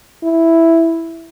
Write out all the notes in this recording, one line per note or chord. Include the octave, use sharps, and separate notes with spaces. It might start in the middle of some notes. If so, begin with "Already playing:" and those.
E4